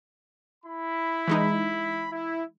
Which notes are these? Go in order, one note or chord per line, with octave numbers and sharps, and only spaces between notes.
E4 B5
E3 G#3 D#4
E4